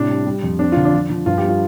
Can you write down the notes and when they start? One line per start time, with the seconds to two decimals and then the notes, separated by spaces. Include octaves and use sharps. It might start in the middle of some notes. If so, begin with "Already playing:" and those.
Already playing: A2 C3 D4
0.09 G3
0.26 G3
0.43 F2
0.59 C4 D4
0.72 D3 F4
0.85 D4
0.94 F3
1.10 F3
1.26 G2 F4
1.38 G4
1.44 G3 F4